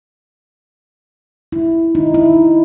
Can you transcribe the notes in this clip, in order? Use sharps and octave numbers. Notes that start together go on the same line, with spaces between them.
E4
D#4
E4